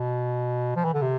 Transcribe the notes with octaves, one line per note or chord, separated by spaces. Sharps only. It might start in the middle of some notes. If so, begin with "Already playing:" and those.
Already playing: B2
F3
E3
D3
C3